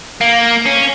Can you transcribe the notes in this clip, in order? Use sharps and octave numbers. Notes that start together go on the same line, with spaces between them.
A#3
C#4